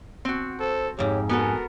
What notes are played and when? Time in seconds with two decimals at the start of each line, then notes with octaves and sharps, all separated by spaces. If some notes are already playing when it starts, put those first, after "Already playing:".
0.25 C4 F#4
0.60 A4 C5
0.99 F2 G#2 G4 C#5
1.29 B3 F#4 A4 A#4 G#5